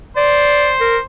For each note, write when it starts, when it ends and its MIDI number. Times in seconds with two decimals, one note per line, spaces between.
0.17 1.01 72
0.17 0.72 74
0.80 0.97 70